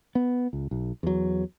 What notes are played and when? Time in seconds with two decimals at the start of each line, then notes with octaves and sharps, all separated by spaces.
0.15 B3
0.53 C#2
0.71 B1
1.03 E2 F#3